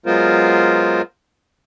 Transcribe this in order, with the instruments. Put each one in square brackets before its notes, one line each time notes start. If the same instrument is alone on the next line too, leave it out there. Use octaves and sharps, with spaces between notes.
[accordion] F#3 G#3 B3 F4 A#4 C5